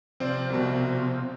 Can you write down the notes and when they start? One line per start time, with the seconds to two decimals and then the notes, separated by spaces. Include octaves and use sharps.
0.20 C3 F3 C4 C5 D5
0.50 C2 B2